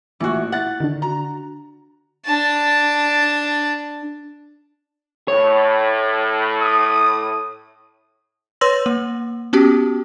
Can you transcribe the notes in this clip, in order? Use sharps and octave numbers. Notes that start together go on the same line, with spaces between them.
A1 A#2 E3 F3 F#4
E4 F#5 A6
D3 D#3 D4
F#4 A#5
D4 A5
A2 C#5
D#6
B4 C#5 C6 E6 A#6 F#7
A#3
B3 C#4 F#4 G4